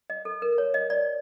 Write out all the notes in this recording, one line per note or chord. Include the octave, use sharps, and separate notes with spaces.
D#5
A4
A#4
C#5
D#5
D5